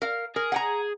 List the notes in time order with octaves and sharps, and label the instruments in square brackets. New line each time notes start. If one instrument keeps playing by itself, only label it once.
[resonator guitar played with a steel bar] A#4 F5
[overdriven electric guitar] G#4 [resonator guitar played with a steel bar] A#4
[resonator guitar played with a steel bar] F#5 G5 A#5